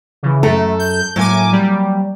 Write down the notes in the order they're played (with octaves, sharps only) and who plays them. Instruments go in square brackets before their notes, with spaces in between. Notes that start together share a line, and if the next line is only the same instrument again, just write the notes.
[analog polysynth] C#3 E3
[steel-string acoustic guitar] F#2 A4 A#5 [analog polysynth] A3
[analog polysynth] G6
[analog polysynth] A2 G#5 D6 [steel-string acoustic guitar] F#3 A#3
[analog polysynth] G3